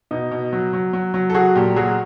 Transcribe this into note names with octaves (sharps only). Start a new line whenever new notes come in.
B2 D#4
B2
F#3
F#3
F#3
F#3
A4
F#3 F#4 G#4
A#2 G4 A4
F#3 F#4 G#4